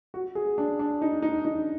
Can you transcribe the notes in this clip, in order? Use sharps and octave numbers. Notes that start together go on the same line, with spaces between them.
F#4
G#4
D4
D4
D#4
D#4
D#4